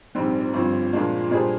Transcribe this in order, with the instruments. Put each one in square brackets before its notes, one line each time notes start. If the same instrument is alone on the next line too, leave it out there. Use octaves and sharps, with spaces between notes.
[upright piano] A#1 G#2 G3 C4
G1 G2 F3 C4
A#2 F3 G#3 D4 F4
A#2 G3 D4 G#4 C5